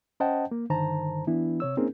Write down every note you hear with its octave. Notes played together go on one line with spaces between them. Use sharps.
C#4 C5 D#5 F#5 G5 A5
A#3
G2 D3 D#3 C5 A5 A#5
E3 B3 D4 E4
C3 C#5 E6
A#3 C4 C#4 D#4 G#4 A#4